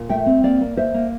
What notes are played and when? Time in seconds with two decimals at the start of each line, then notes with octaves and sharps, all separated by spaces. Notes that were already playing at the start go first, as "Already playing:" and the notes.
Already playing: A#2
0.09 A3 E5 G5
0.26 C4
0.43 A#3 D5 F5
0.61 A#3
0.77 A#3 C5 E5
0.94 A#3